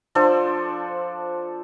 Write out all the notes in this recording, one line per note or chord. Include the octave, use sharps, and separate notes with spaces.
F3 D4 A4 C5